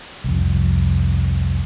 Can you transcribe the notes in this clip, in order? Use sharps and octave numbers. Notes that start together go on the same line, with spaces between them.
C2 F2